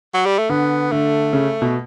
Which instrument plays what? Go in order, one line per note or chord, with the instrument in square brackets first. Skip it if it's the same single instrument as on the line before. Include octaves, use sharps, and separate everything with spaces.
[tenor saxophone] F#3
G3
A3
[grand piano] D3 [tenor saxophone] B3
[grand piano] D3 [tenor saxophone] A3
[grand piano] C#3
B2